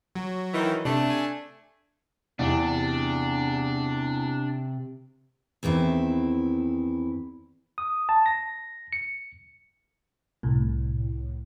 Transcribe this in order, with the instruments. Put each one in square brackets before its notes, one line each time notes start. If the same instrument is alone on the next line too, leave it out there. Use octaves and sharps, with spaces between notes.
[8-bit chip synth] F#3
[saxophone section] D#3 E3
[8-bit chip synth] C3 [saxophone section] A3 D4
[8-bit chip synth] G#5
[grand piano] E2 [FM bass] C3 [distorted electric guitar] D4
[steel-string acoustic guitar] E2 D#3 C4 E4
[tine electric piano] D#6
A5
A#6
C#7
[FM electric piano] C2 A2